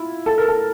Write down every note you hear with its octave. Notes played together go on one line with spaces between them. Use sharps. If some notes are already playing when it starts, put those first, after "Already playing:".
Already playing: E4 F4
A4
A#4
A4